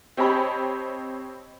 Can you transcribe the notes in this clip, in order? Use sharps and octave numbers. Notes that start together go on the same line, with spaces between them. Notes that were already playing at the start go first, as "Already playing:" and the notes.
C4 G4 C#5 D#5 A5 B5